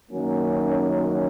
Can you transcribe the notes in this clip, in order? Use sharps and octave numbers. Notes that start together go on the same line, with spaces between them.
F#2 D#3 F#3 A#3 C#4